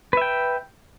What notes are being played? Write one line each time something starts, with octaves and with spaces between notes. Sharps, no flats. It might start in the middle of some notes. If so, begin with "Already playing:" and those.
B4 E5 G5